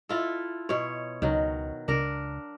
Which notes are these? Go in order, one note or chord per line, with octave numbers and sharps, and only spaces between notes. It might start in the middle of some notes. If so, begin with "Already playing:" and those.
E4 F4 A4
B2 C#5
C#2 D#3 F#3
C#2 D4 A#4